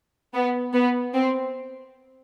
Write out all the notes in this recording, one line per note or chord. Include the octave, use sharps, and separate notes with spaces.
B3
B3
C4